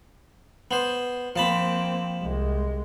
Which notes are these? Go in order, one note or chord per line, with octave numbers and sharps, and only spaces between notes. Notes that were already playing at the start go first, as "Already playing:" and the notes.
B3 C5
F3 A#3 C4 A5 B5
C2 G#3